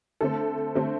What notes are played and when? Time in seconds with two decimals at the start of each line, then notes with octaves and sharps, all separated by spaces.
0.21 D3 A3 C4 A4
0.75 D3 A3 C4